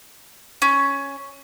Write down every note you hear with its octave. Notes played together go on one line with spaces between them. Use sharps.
C#4